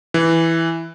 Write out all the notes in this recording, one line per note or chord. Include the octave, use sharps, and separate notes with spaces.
E3